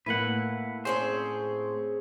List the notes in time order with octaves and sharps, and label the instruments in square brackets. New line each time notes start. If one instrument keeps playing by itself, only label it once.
[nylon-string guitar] A2 A#3 E4 [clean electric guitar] B4 F#5
[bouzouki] C4 C#4 G#4 [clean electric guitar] C5